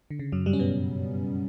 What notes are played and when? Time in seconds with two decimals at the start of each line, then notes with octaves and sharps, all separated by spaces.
0.11 D3
0.19 C#3
0.32 F#2 F#3
0.46 G2 G3
0.53 C#4
0.59 B2 B3